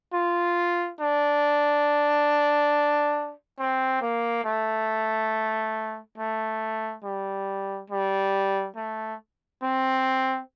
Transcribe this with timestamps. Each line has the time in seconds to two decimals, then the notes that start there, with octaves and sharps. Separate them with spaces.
0.13 F4
1.00 D4
3.58 C4
4.01 A#3
4.44 A3
6.18 A3
7.03 G3
7.90 G3
8.76 A3
9.62 C4